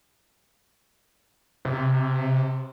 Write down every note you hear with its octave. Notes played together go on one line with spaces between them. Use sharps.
C3